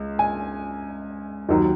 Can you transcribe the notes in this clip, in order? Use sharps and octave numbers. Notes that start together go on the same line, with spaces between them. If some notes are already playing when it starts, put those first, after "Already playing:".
Already playing: C#2
G#5
D#2 D#3 F#3